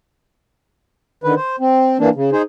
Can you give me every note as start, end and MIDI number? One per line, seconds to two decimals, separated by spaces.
1.24 1.34 50
1.24 1.34 51
1.24 1.34 71
1.36 1.56 72
1.60 1.97 60
2.00 2.09 52
2.00 2.09 58
2.00 2.09 62
2.15 2.30 49
2.32 2.42 63
2.32 2.42 68
2.32 2.42 72